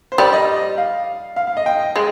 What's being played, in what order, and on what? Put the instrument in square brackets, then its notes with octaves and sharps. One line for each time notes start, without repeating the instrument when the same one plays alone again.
[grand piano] C5
[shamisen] G3 [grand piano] D5
[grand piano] D#5
F5
F5
F5
D#5
G5
[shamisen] G#3